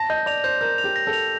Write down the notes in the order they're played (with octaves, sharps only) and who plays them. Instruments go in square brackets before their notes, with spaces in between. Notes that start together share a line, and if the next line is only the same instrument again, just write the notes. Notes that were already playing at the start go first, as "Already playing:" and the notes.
Already playing: [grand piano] A5 [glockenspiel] A#6
[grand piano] D#5 [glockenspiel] G6
[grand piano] D5 [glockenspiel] F7
[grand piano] C5 [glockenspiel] G6
[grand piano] A#4 [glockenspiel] G6
[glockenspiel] F7
[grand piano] G4
[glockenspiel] A#6
[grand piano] A4
[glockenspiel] F7